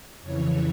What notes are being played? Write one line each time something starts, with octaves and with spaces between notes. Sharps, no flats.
F2 C#3 E3 C#5